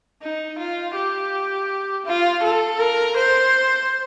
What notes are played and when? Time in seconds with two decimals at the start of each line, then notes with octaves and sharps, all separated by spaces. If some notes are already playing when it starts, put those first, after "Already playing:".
0.22 D#4
0.59 F4
0.96 G4
2.06 F4
2.43 A4
2.79 A#4
3.17 C5